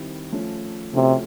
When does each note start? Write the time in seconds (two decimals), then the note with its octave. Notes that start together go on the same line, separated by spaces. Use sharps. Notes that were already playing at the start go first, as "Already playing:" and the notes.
Already playing: D#3 G3 C4 E4
0.32 F3 A3 C#4
0.94 C3 F3 A3 C#4 F#4 A4